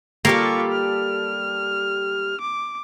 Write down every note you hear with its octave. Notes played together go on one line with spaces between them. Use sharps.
G3 A#3 F4 G4 A4 C#6
F6
D6